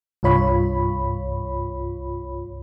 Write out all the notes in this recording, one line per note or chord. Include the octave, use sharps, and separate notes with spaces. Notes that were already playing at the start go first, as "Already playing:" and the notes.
C2 G2 F4 C#5 B5